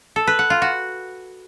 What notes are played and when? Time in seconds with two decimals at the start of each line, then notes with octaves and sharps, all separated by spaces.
0.16 A4
0.27 B4
0.39 F#5
0.50 F4
0.62 F#4